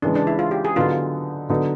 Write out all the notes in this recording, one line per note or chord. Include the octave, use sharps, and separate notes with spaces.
C#3 E3 G#3 D4
D4
E4
F4
G4
G#4
D3 F#3 B3 D#4 F4
D3 F#3 B3 D#4